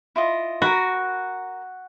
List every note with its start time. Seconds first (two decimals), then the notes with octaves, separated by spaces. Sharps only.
0.16 E4 F4 D#5
0.62 F#4 A#4 B5